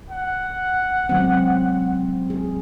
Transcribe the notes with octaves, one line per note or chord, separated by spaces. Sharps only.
F#5
F#3 G#3 C4
G#4